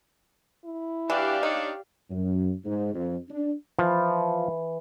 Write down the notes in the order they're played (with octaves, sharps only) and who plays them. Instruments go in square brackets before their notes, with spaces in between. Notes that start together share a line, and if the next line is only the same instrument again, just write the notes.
[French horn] E4
[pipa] E3 [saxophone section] D4 F#4 [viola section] G4 D5 F5
[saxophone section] D4 C#5 [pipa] D#4
[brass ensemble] F#2
G#2
F2
D4
[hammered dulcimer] E3 [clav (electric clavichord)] F3